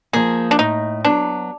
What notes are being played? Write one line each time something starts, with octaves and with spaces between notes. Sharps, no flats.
F3 A#3 G#4
D4
A2 D#4
F#3 B3 D4